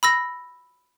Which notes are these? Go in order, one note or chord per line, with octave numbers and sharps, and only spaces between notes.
B5 E6 A#6